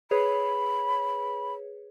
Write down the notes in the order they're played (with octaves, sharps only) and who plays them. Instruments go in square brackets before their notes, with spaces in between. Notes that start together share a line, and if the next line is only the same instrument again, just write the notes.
[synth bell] G#4 B4 C#5 [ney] B5